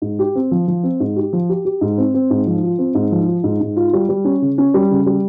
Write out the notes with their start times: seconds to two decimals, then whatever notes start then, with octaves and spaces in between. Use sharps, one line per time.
0.02 G#2
0.19 G4
0.35 C4
0.51 F3
0.68 F3
0.83 C4
1.00 G#2
1.16 G4
1.33 F3
1.49 G4
1.65 G4
1.81 G#2
1.98 C4
2.14 C4
2.30 G#2
2.47 F3
2.63 F4
2.79 C4
2.95 G#2
3.12 F3
3.28 F4
3.44 G#2
3.60 G#2
3.76 F4
3.93 G3
4.09 G3
4.25 C#4
4.42 C#3
4.58 C#4
4.74 G3
4.91 C#3
5.06 G3